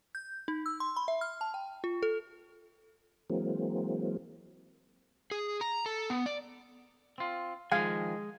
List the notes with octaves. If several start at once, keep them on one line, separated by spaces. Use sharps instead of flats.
G6
D#4
E6
C6
B5
E5
F6
A5
G5
F4
A4
E3 F#3 G#3 A#3 C4
G#4
A#5
A4
B3
D5
C4 F4
D#3 F3 G#3 F5 G#5